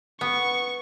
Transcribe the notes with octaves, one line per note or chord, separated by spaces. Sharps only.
B3 C#6